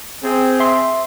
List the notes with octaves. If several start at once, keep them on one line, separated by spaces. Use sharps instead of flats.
C4 G#4
E5 C6